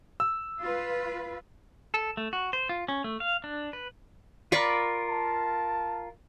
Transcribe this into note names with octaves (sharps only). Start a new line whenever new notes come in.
E6
F4 B4
A4
A3
F#4
C5
F4
C#4
A3
F5
D4
B4
F4 A#4 D5 B5 C#6
A5